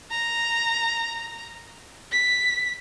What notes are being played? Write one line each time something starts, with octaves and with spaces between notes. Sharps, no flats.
A#5
B6